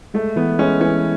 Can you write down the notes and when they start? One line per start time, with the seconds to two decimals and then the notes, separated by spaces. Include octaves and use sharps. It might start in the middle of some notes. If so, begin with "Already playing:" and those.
0.14 G#3 A3
0.36 E3 B3
0.59 G#3 C#4
0.81 E3 C#4